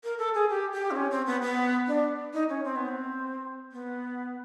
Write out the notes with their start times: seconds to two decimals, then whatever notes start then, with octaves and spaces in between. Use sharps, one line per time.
0.04 A#4
0.18 A4
0.34 G#4
0.50 G4
0.73 G4
0.91 C4
0.96 C#4
1.11 C4
1.26 B3
1.42 B3
1.87 D4
2.33 D#4
2.49 C#4
2.64 C4
2.76 B3
2.88 C4
3.72 B3